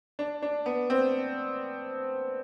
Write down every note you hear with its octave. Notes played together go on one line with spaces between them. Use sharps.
D4
D4
B3
C4